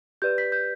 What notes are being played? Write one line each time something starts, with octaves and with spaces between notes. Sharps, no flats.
G4 B4 D5 G6
B6
G6